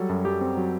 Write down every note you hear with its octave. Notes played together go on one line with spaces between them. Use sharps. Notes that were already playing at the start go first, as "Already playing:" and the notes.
Already playing: F#3 G3 A4
F#2
F#2 G4
C4
F#3